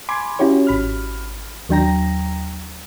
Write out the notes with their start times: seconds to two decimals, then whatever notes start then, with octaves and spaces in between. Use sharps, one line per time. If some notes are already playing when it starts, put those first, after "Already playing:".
0.09 G#5 B5 C6 D6 G#6
0.39 C#4 E4 F#4 G4 C#5
0.67 G#1 B5 F6
1.69 D#2 F#3 D4 G5 A#5 A#6